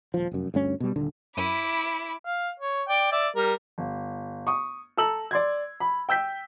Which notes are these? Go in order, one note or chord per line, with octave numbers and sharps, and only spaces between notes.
D#1 F3
F1 F#2
D2 G2 C#4
B2 G3
D#1 D3
F#2 E4 B5 D6 D#7
F5
C#5
D5 G5
D5 E5
G3 A#4
G1
C#6 D#6
A4 A#5 E6 F#7
D5 C6 G#6
B5
G5 E6 G6 B6